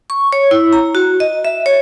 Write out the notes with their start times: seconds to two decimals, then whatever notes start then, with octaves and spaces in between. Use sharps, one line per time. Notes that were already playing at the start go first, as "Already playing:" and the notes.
0.10 C#6
0.33 C#5
0.51 E4
0.73 A#5
0.95 F#4
1.20 D#5
1.45 E5
1.66 C#5